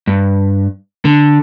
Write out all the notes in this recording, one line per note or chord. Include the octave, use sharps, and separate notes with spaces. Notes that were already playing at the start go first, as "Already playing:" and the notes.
G2
D3